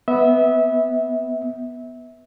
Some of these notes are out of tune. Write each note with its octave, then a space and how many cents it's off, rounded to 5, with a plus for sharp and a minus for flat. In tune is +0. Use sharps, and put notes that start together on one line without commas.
B3 +0 E5 -25